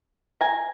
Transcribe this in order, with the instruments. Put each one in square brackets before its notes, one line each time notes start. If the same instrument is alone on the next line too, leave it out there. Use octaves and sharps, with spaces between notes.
[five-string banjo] G#5 A#5